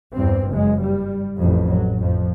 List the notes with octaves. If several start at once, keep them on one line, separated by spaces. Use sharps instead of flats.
E2 G2 C4
F#1 G#3
G3
A1 F2
F#3
F2 F3